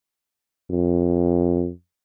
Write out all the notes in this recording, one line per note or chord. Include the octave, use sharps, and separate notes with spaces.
F2